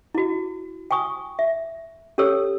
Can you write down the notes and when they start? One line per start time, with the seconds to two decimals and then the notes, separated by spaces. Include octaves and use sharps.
0.15 E4 F#4
0.91 G5 G#5 C#6 D#6
1.39 E5
2.18 C#4 G4 A4 C#5 E6